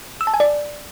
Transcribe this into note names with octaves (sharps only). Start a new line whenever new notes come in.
E6
A5
G#5
D5